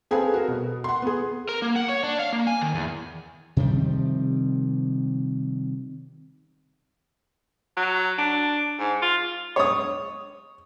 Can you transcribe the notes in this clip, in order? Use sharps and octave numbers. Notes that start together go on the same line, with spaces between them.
C4 G#4 A4 B4 F5 G#5
F#4 A#4
B2
F#5 C6
B3 G#4
A#4
A#3
F#5
C#5
D4
F5
A#3
G#5
D#3
E2
C3 D#3 F3 G3
F#3
D4
G#2
F4
C#5 D#6